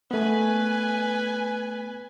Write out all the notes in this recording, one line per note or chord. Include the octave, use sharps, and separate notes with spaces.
A3 B3 B4 G#5